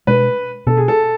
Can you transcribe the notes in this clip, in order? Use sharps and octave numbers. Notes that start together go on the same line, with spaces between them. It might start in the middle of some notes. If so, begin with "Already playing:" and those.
B2 G#3 D4 B4
B2 B3 D4 A4
G#4
A4